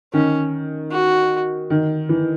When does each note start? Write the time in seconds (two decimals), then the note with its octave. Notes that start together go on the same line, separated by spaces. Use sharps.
0.13 D#3 C#4
0.91 F#4
1.70 D#3
2.09 E3